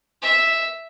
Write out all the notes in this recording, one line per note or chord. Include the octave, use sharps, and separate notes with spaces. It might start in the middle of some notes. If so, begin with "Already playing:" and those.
E5